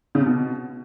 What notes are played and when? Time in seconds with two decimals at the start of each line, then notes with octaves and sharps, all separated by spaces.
0.15 C#3
0.20 C3
0.26 B2